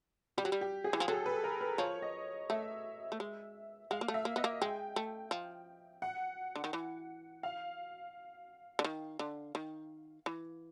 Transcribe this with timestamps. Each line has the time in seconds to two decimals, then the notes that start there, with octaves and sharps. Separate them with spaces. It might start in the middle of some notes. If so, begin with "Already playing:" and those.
0.38 G3 G4
0.45 F#3
0.52 G3
0.61 G4
0.84 G#4
0.93 E3
1.00 F3
1.08 F#3 A4
1.26 B4
1.44 A#4
1.61 B4
1.78 F3 C#5
2.02 D#5
2.50 A3 E5
3.12 A3
3.20 G#3
3.91 G#3 F5
4.01 A#3
4.08 A3
4.14 E5
4.25 A#3
4.36 B3 D#5
4.44 A#3
4.61 G#3 G5
4.96 A3
5.31 F3
6.02 F#5
6.56 D3
6.64 D#3
6.73 E3
7.43 F5
8.79 D3
8.84 D#3
9.19 D3
9.55 D#3
10.26 E3